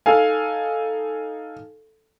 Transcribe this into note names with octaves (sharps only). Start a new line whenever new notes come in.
D#4 A4 F5 G#5